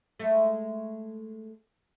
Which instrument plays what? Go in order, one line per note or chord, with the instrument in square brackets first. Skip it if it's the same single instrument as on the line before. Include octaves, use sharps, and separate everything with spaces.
[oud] G#3 A3